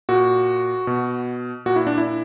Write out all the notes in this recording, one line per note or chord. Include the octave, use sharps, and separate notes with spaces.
A#2 F#4
B2
A#2 F#4
E4
D4
E4